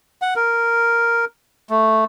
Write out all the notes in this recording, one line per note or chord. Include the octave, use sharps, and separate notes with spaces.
F#5
A#4
A3